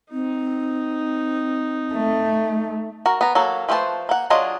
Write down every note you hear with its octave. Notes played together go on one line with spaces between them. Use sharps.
C4 D#4
A3
F#4 A#4
B3 A#5
F#3 A#3 A4
F3 A3 B4 C5 A5
A#3 F#5
F#3 D4 F4 G#4 D#5